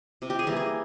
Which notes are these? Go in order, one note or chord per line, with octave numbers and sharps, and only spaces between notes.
C3
G4
G#4
E3 G3 A#3
G#4